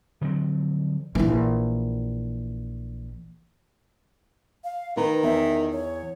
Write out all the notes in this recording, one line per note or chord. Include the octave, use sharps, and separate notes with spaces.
D3 F3 F#3 C4
A#1 E3
F5
D#3 B4 A#5
E2 E5
C#5